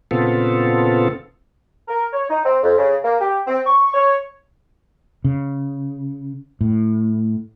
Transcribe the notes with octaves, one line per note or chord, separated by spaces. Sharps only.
A#2 C#3 B3 C4 F4 A4
A#4
C#5
D#4
C4
F2
C#3
A#3
G4
C4
C#6
C#5
C#3
A2